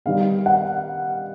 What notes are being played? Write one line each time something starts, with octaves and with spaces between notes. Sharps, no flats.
D#3 G3 B3 F5
F#5